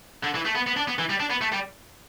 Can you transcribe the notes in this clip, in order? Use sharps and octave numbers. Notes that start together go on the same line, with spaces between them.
D3
E3
A3
B3
B3
D4
B3
E3
G3
D4
B3
A3
G3